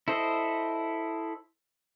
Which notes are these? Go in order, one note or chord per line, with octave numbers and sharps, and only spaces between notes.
E4 A4 C5 D#5